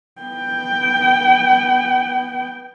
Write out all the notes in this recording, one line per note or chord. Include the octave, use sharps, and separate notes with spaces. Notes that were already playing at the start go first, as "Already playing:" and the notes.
B3 G5